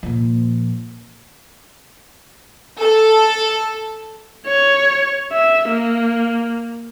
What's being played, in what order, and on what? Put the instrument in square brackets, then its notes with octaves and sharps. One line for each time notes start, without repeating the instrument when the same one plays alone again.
[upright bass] A#2 F3
[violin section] A4
[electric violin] C#5
E5
A#3